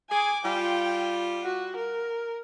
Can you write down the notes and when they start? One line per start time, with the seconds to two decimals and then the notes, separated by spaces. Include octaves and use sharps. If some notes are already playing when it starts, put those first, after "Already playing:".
0.10 G#4 G#5 D6
0.45 G3 F4 G5
1.44 F#4
1.76 A#4